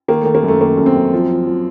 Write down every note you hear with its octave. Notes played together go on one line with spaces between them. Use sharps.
D#3 A#3
A3
D#3
A#3
F#2
A3
D#3 A#3
F#2
C4
F#2
F3
F3
F3